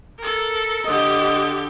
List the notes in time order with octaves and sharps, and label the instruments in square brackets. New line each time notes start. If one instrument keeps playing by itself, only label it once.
[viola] A4 A#4
[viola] D3 G4 [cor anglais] D#5